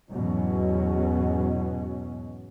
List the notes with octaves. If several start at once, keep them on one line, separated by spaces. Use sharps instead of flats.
E2 G#2 B2 F#3 C#4